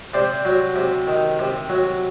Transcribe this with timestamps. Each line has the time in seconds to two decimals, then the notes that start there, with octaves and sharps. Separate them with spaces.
0.14 C3 C5 D5
0.45 F#3
0.76 C3
1.07 D#3
1.39 C3
1.69 F#3